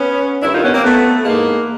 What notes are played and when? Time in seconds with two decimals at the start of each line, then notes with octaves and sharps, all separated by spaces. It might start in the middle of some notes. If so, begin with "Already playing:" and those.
Already playing: B3 C#4
0.42 G2 D#3 D4 E4
0.53 D#4 F4
0.63 B3 C#4
0.73 A#3 C4
0.84 A3 B3
1.25 G#2 E3 G#3 A#3